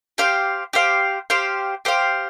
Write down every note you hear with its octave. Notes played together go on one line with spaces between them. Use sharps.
G4 C5 F5
G4 C5 F5
G4 C5 F5
G4 C5 F5